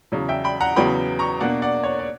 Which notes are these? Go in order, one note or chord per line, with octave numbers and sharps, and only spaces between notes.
E2 C#3 F#3
E5 G5
G5 B5
F#5 A#5
E2 C#3 F#3 B3 G5 B5
A#5 C#6
B2 A#3 D4 D5 F#5
D5 F#5
C#5
D5